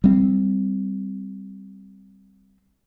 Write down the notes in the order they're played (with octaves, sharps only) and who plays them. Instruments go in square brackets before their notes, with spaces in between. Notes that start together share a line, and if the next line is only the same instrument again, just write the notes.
[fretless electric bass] G3 C4